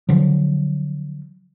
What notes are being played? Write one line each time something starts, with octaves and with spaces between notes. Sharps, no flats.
D3 F3 F#3